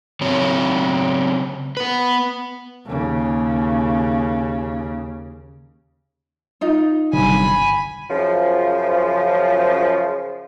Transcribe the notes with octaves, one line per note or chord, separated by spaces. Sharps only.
C#3 F#3 C4 C#5
B3 B4
D#2 C#3
D#4 F4
G1 C2 D3 D#3 F#3 G#5 B5
F#2 C#3 F3